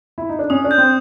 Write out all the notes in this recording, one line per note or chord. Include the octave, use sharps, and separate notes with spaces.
E4
D#4
D4
C#4 D#6
D4
G6
C4